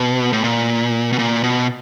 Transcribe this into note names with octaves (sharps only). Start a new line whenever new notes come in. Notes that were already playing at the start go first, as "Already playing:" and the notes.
Already playing: B2
A2
A#2
B2
A#2
B2